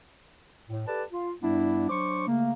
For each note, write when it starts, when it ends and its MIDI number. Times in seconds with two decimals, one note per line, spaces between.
0.69 0.84 45
0.87 1.03 67
0.87 1.03 69
0.87 1.03 71
0.87 1.03 74
0.87 1.03 81
1.11 1.31 65
1.42 1.86 43
1.42 1.86 55
1.42 1.86 59
1.42 1.86 62
1.42 1.86 64
1.89 2.25 54
1.89 2.25 62
1.89 2.25 72
1.89 2.25 85
1.89 2.25 86
2.27 2.52 49
2.27 2.52 57
2.27 2.52 58